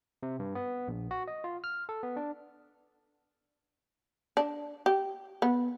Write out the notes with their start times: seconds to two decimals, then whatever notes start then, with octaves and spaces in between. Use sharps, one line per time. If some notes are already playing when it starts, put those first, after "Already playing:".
0.23 C3
0.40 G2
0.55 B3
0.88 A#1
1.11 F#4
1.28 D#5
1.44 F4
1.64 F6
1.89 A4
2.03 B3
2.17 D4
4.37 D4
4.86 G4
5.42 B3